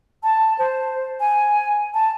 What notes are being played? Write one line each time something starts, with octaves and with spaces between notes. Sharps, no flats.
A5
C5
G#5
A5